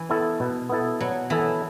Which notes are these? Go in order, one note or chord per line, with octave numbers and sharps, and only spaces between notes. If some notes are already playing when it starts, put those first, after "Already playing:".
Already playing: E3
B3 E4 A4
B2
B3 E4 A4
B2 F#3
E3 B3 E4 A4